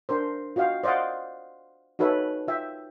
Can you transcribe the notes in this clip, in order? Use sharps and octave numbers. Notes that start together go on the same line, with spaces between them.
D4 A#4 C5
F4 F#4 D#5 F5 G5
C5 D5 D#5 F5 F#5
D#4 F#4 A4 B4 C#5 E5
F4 E5 G5